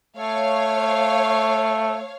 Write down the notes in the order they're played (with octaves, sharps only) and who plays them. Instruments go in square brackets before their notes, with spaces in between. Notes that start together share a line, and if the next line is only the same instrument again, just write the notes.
[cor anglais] A3 [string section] C#5 F5